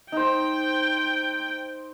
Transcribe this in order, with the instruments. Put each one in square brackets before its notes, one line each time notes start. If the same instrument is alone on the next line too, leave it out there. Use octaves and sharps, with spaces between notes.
[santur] D#4 C5 [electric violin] G5